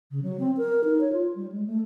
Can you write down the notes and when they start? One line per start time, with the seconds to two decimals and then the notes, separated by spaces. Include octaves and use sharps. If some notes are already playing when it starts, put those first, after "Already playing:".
0.11 C#3
0.23 F#3
0.40 C4
0.57 A#4
0.84 D#4
1.01 C#5
1.13 F4
1.35 G3
1.52 G#3
1.67 A3